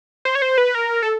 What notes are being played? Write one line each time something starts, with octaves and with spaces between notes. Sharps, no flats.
C5
C#5
C5
B4
A#4
A4